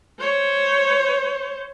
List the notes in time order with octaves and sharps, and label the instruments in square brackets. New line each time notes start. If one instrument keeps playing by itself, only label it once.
[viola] C5 C#5